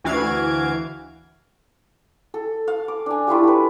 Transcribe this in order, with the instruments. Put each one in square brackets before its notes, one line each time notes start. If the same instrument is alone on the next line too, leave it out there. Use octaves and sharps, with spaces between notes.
[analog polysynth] D2 E3 F#4 F5 G#6 D7
[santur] A4
F5
D6
D4 G#5
A3 E4 F4 G4
G4 B4